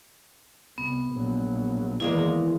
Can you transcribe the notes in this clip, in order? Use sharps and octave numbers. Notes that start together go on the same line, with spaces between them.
C2 B3
A#1 F#3
E2 D#3 E3 G#3 A#3 E4 F5